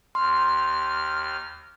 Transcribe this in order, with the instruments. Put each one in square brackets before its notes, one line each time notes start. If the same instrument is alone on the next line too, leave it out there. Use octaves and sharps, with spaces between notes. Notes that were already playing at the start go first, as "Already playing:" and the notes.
[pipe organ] D#2 F6 [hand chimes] C6